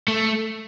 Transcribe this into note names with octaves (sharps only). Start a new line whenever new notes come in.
A3